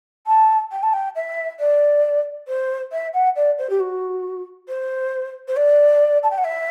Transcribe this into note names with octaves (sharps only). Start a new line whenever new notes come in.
A5
G5
A5
G5
E5
D5
C5
E5
F#5
D5
C5
G4
F#4
C5
C5
D5
A5
G5
F#5
E5